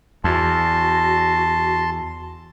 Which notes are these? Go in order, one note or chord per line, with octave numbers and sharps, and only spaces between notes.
E2 F#4 A5 C6